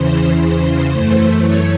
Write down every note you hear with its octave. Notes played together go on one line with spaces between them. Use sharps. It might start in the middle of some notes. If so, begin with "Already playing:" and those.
Already playing: E2 C#3 E3 C5
C5
F#2 E3 A3
C#5